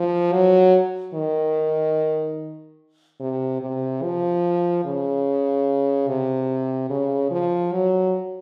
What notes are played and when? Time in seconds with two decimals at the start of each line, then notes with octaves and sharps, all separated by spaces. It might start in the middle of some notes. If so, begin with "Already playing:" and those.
Already playing: F3
0.33 F#3
1.14 D#3
3.20 C3
3.61 C3
4.03 F3
4.85 C#3
6.08 C3
6.90 C#3
7.31 F3
7.73 F#3